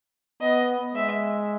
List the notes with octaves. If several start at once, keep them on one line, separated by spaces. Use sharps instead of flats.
B3 D#5
G#3 E5